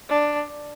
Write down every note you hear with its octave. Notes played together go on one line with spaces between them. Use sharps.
D4